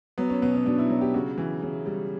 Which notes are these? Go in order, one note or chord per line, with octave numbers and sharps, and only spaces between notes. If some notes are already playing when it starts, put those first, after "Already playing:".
F#3 B3
C#4
B2 B3
C#4
B2 D4
E4
F#3
G4
C#3 F#4
E3
C#3
G3